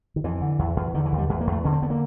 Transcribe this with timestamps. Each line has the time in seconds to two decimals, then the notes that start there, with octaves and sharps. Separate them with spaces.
0.16 D#3
0.24 F2 E3
0.41 D3
0.59 E2
0.76 E2
0.94 D3 D#3
1.06 E3
1.12 D#2
1.18 G3
1.29 E2 G#3
1.41 A#3
1.47 E2
1.52 A3
1.64 D3 C#4
1.73 C4
1.82 D3 B3
1.90 A#3